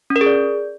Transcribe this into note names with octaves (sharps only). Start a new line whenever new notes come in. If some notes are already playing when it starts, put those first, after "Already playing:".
C#4
A#4
G#4
D5